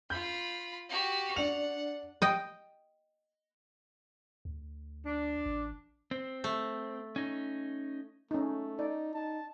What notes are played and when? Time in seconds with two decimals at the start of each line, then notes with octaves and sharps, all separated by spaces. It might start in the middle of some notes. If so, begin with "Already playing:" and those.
0.10 F4 B5 G6
0.89 F#4 G4
1.36 D4 F#5 F7
2.22 D#5 G5
4.45 D2
5.06 D4
5.46 A1
6.11 C4
6.44 A3
7.16 C#4 D#4
8.31 A3 C#4 D#4
8.79 D#4 D5
9.14 D#4 A5